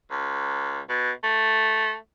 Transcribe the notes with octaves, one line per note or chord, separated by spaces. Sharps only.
C#2
B2
A3